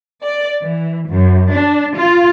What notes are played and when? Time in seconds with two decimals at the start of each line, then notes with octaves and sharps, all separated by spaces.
0.23 D5
0.61 E3
1.10 F#2
1.53 D4
1.98 F4